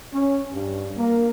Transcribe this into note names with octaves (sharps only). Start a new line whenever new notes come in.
C#4
G2
A#3